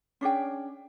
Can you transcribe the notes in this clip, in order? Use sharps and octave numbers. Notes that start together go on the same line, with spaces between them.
C#4 D4 G#4 G5